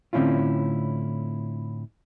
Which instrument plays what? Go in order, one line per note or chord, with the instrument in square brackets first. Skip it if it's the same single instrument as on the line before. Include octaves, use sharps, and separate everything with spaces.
[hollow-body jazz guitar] A2 D3 C4 C#4 E4 F4